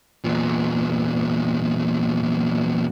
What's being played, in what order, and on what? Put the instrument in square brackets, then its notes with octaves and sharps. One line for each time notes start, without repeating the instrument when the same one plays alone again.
[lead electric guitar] E2 A#2